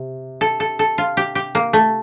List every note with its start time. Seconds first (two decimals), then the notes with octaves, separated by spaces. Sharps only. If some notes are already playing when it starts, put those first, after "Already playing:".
Already playing: C3
0.41 A4
0.60 A4
0.79 A4
0.98 F4
1.17 G4
1.35 G4
1.55 A#3
1.73 A3